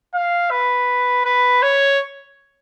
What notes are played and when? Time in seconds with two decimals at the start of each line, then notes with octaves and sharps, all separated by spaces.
0.14 F5
0.51 B4
1.25 B4
1.62 C#5